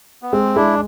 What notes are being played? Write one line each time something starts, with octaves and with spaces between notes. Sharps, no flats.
B3
G#3 C4
G#3 D4 E4